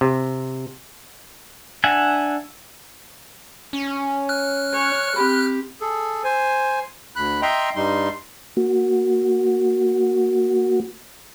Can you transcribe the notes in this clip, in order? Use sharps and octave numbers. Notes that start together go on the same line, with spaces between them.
C3
D4 E5 F#5 G#5
C#4
F6 F#6
C#5 G#5
C4 G4 B5
G#4 A4
C5 G#5
D2 B5 F#6
D#5 E5 G5 A#5 C6
G2 G3 D#4 C6
A#3 F#4